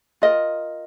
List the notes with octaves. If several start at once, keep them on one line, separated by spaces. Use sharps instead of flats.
F4 A#4 D#5